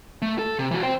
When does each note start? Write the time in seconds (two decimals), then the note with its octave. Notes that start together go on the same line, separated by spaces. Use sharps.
0.22 A3
0.39 A4
0.59 C3
0.71 E3 F#4
0.83 C5 G5